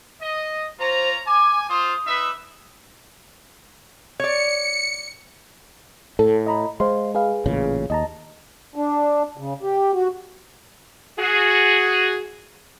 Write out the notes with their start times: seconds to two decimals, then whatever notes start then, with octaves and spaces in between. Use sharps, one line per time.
0.22 D#5
0.80 F4 C5 C#5 A#5
1.27 G#5 D6
1.70 F4 C5 D#6
2.07 D#4 B4 E5
4.20 C#5 D5 C#7
6.19 A2 A4
6.47 D#5 A#5 B5
6.80 G#3 C5 F5 C6
7.15 G#4 B4 F5
7.46 A1 A#2 C#3
7.90 D#2 D#5 A5 A#5
8.76 D4
9.37 C#3
9.62 G4
9.93 F#4
11.18 F#4 G#4